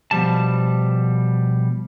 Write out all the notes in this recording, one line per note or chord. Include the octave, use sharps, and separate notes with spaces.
B2 F3 G3 A5